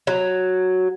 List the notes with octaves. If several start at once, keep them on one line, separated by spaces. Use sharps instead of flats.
F#3